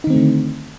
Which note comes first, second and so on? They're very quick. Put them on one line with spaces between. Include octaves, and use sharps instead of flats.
D#4 D#3 C4 A3 D3